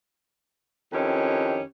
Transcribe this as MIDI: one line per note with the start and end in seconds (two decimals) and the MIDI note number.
0.92 1.60 41
0.92 1.60 51
0.92 1.60 61
0.92 1.60 64
0.92 1.60 67